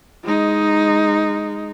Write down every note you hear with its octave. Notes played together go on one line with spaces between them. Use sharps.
G#3 D#4